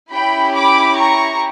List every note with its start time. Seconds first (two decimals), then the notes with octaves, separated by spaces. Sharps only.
0.12 C#4 E4 G4 G5 B5
0.55 B5 D6
0.97 A#5 C#6